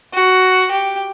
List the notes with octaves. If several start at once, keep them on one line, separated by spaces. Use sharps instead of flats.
F#4
G4